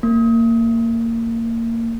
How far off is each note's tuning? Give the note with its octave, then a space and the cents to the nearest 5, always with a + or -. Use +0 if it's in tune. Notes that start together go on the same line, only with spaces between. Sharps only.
A#3 -25